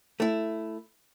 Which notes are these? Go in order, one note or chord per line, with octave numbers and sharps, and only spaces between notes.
A3 E4